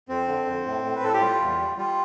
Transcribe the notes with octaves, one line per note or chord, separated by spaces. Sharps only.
F2 C4
D3
F2
A2
A2
B4
A2 A4
G4
G3 F4
E2
G3
G3 F4